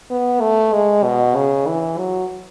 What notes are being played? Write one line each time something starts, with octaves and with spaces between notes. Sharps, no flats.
B3
A3
G#3
B2
C#3
E3
F#3